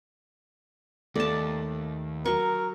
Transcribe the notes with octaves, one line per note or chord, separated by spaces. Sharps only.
D#2 A3 D5 A5
F#3 A#4 C#6